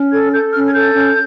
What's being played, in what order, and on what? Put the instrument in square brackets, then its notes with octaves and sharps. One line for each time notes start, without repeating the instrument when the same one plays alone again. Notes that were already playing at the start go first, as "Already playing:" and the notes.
Already playing: [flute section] C#4
A4 G#6
A4 G6
C#4 F6
G#6
A4 G6
C#4